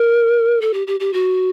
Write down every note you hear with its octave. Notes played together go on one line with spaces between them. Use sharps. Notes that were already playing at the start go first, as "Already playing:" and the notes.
Already playing: A#4
A4
G4
G4
G4
F#4